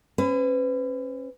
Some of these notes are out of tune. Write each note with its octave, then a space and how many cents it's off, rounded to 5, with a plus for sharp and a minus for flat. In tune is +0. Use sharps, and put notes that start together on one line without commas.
C#4 -30 B4 +35